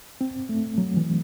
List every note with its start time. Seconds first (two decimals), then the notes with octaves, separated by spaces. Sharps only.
0.21 C4
0.49 A3
0.78 F#3
0.97 E3